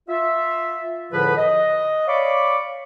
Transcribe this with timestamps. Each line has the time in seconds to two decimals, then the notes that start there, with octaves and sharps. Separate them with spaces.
0.08 F4 E5
1.12 C#2 A2 D3 F3 B4
1.37 D#5
2.08 C#5 D5 F5 B5 C#6 D6